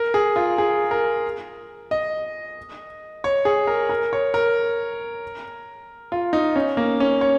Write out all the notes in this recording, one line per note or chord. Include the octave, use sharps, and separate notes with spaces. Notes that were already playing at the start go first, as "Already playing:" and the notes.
Already playing: A#4
G#4
F4
G#4
A#4
D#5
C#5
G#4
A#4
A#4
C#5
A#4
F4
D#4
C#4
A#3
C#4
C#5